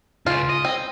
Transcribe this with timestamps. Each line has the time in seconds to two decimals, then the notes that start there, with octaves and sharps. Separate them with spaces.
0.27 C#2 C#3 F4
0.49 D#5
0.65 C4